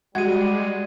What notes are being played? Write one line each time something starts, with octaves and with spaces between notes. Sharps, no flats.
G3 G#3 F#4 G#6 D#7